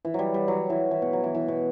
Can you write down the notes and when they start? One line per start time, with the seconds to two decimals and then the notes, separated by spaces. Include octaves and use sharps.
0.05 E3
0.14 F#3 G3
0.34 G3
0.48 F#3
0.70 E3
0.91 E3
1.02 B2
1.13 F#3
1.24 E3
1.35 E3
1.48 B2